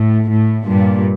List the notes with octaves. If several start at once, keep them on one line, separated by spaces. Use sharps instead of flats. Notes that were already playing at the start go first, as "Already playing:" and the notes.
Already playing: A2
A2
G2 A#2